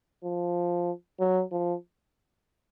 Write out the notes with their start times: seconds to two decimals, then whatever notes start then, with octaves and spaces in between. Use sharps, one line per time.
0.24 F3
1.20 F#3
1.52 F3